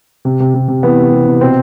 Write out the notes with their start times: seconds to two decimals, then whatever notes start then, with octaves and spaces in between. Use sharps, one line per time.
0.25 C3
0.40 C3
0.54 C3
0.68 C3
0.83 E3 B3
0.98 C3
1.12 C3
1.26 C3
1.41 B2 C4